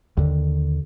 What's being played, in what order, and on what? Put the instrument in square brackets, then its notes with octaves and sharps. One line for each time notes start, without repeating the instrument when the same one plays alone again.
[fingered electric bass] D#2 D3